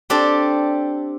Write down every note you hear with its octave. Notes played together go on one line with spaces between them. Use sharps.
C4 D4 G4 A4